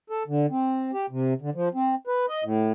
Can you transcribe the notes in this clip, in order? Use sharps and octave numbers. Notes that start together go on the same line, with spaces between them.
A4
D3
C4
G4
C3
D3
F3
C4
B4
D#5
A2